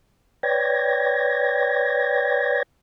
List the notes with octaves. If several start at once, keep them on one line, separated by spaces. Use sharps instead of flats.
B4 C#5 D5 G5 G#6 A#6